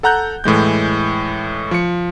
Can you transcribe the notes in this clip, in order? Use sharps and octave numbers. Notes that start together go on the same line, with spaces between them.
A4 F#5 A#5 F#6 G6
A2 E3 G#3 G6
F3 C#7